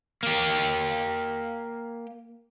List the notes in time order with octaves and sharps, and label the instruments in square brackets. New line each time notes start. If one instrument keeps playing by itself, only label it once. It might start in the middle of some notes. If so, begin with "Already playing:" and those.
[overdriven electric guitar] A#3 G4